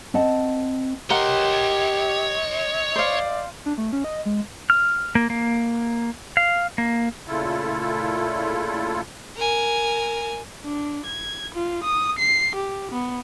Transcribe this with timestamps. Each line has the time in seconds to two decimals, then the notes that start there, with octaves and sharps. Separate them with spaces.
0.14 C4 D#5 F#5 A5
1.10 G4 A#4 C#5 D#5 F#5 C6
2.96 C5 D5 F5
3.66 D4
3.78 A3
3.93 C#4
4.04 D#5
4.26 G#3
4.70 F6
5.15 A#3
5.30 A#3
6.37 F5
6.78 A#3
7.27 A#2 C#3 A3 E4 F4 A4
9.37 A#4 G#5
10.64 D4
11.06 G#6
11.55 F4
11.84 D#6
12.19 C7
12.56 G4
12.92 B3